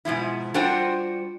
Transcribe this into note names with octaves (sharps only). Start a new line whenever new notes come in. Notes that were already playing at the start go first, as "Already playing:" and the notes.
G#2 B2 F3 E4
G3 D4 F4 F#4 C5 G5